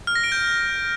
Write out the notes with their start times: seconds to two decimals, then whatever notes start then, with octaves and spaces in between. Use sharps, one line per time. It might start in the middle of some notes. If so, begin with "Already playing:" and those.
0.07 F6
0.15 A#6
0.24 D7
0.32 G6